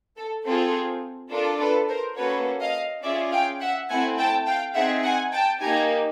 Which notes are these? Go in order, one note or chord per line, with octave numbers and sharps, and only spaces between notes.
A4
C4 F4 G#4 A4
D4 F4 A4 A#4
A4 B4
A#4 C5
A#3 C#4 F#4 A4 B4 C#5
D#5 F5
C#4 F4 G#4 D5 E5
F5 G5
E5 F#5
A3 C4 E4 F#5 G#5
G5 A5
F5 G5
C4 D#4 G#4 E5 F#5
F#5 G#5
G5 A5
A#3 D#4 G4 G#5 A#5